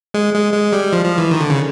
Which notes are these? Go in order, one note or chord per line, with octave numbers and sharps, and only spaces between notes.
G#3
G#3
G#3
G3
F3
F3
E3
D#3
D3
C#3